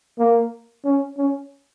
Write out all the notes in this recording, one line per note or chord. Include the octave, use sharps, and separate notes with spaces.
A#3
C#4
C#4